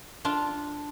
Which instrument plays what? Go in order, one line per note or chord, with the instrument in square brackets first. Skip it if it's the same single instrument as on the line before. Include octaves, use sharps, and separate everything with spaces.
[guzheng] D4 F4